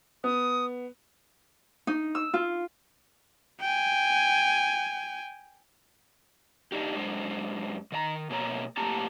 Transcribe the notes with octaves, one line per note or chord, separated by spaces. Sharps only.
B3 D#6
D#4
E6
F4
G5 G#5
D4 D#4 G4
F#2 G#3 D4 C5
D#3 D5 A#5
B2 A#3 G#4 C#5 A#5
A2 A#3 G4 A5 A#5